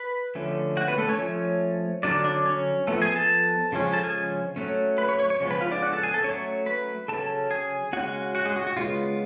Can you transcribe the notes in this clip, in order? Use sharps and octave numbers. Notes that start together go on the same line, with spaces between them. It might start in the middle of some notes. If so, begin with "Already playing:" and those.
Already playing: B4 B5
D3 F3 A3 C#4
F#4 F#5
B3 B4
A3 A4
C#4 C#5
F3 A3 C#4
D3 F#3 C#4 D4 D5
D4 D5
C#4 C#5
F3 A3 B3 A4
G#4 G#5
A4 A5
C#3 F3 G#3 C#4
A4 A5
G#4 G#5
F#3 A3 C#4
B4 B5
C#5 C#6
C#5 C#6
C#5 C#6
C#3 F3 G#3 B3
B4 B5
F4 F5
D4 D5
F#4 F#5
A4 A5
G#4 G#5
A4 A5
F#3 A3 C#4 C#5 C#6
B4 B5
C#3 F#3 C#4 A4 A5
G#4 G#5
C#3 G#3 C#4 F#4 F#5
F#4 F#5
G#3 G#4
F#4
F#4
C#3 G#3 B3 F4